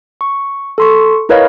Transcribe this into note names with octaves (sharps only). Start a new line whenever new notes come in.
C#6
A4 C6 C#6
E4 A#4 B4 C#5 D#5 F5